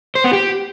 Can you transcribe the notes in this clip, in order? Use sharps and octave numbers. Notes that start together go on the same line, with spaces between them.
C5
B3
G4